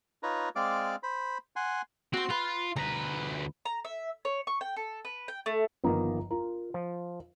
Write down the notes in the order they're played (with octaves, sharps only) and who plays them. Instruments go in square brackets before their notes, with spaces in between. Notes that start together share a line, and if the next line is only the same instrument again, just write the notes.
[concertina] D#4 F4 B4 C#5 A#5
G#3 C4 D5 F5 D6
C5 B5
F#5 G#5 C6
[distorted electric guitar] C4 [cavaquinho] F#4 C6
[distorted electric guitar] F4 [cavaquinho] B4
[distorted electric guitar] D2 B4 [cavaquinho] A#5
[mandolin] A#5
E5
C#5
C#6
G5
A4
B4
G5
A3
[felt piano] G1 F3 A#5 [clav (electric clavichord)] D#3 A#3 B3
[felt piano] F4 [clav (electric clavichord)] A#4
[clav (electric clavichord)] F3